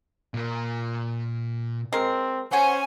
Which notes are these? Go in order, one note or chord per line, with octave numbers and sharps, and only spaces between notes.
A#2 A#4
G#3 C4 A#4
B3 C#4 F#4 C5 C#5 G#5